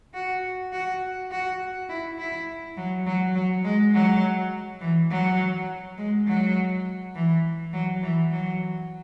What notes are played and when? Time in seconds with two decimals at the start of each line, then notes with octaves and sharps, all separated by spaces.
0.14 F#4
0.72 F#4
1.31 F#4
1.89 E4
2.18 E4
2.77 F#3
3.06 F#3
3.35 F#3
3.64 G#3
3.94 F#3
4.81 E3
5.11 F#3
5.98 G#3
6.27 F#3
7.15 E3
7.73 F#3
8.02 E3
8.31 F#3